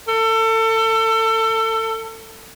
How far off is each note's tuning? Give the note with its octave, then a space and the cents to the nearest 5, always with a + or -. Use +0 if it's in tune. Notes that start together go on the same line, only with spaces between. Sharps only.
A4 +30